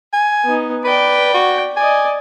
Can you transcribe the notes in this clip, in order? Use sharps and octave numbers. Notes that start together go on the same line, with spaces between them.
G#5
B3 D#4
B4 D5 G5
F#4
D5 D#5 G#5